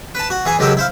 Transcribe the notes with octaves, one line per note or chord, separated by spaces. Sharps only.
B4 A5
F#4
E3 G#4
C#2 D#3 F#3 G#3 G4 A4
E4 C5 F5